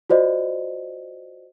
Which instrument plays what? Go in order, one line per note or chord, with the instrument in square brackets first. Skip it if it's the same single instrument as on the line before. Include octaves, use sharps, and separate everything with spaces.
[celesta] F4 F#4 C5 D5 D#5